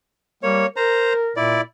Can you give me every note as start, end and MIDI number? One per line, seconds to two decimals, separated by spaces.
0.43 0.64 55
0.43 0.66 58
0.43 0.66 73
0.76 1.31 70
0.76 1.13 72
0.76 1.13 82
1.37 1.60 46
1.37 1.61 64
1.37 1.61 74